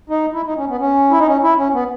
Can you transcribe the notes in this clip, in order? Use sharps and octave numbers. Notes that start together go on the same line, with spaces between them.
D#4
E4
D#4
C#4
B3
C#4
E4
D#4
C#4
E4
C#4
B3